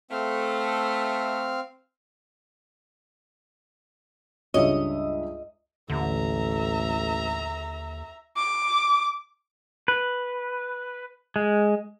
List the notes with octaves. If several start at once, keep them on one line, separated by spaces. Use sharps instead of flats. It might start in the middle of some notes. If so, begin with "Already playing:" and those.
A3 C4 F5
C#2 G2 C#5 D#5 E5
A1 D#2 D3 E5 A#5
D6
B4
G#3